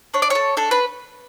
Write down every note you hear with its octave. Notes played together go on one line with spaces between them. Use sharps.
D4 C#5
D5
A4 C#5
D4 A4
B4